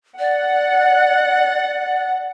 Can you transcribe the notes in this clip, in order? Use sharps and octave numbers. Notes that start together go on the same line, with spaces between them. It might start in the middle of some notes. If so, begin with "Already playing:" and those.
D5 F#5